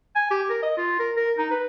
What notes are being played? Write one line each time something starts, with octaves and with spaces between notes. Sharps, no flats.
G#5
G4
A#4
D#5
F4
A#4
A#4
D#4
B4